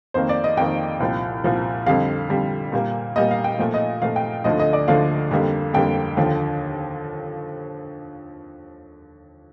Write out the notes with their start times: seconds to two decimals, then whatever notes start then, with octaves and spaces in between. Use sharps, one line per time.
0.14 F2 D#3 A#3 C5
0.29 D5
0.44 D#5
0.57 F2 D#3 A#3 G5
1.00 C2 A#2 F3
1.44 C2 A#2 F3
1.86 F2 D3 G3 F5
2.29 F2 D3 G3
2.72 A#2 G3 A#3
3.16 A#2 G3 A#3 D#5
3.31 F5
3.44 G5
3.58 A#2 F3 A3
3.74 D#5
4.02 A#2 F3 A3 F5
4.16 G5
4.44 D2 D3 F3 A3 D#5
4.60 D#5
4.73 D5
4.88 D2 D3 F3 A3 F5
5.31 F2 D3 G3 A#3
5.73 F2 D3 G3 A#3 G5
6.17 D#2 D3 F3